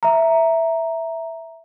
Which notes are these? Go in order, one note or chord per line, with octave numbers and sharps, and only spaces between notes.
E5 A#5